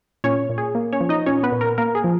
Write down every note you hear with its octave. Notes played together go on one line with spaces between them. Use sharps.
A#2 C#4 C#5
A#2
G#4
A#3
C#4 C#5
F3
D#4 D#5
A#2 C#4 C#5
B3 B4
A#2
A#4
A#3 A#4
G#4
F3